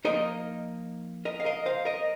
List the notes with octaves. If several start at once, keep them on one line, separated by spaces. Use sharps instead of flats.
F3 A#3 D#4 A#4 D#5
A#4 D#5
F5
A#4 D#5
C5 F5
A#4 D#5